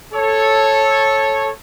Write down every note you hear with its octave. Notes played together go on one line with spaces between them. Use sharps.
A4 C#5